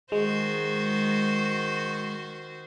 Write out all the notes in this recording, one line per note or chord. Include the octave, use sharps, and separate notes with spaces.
D#3 G#3 F#4 C5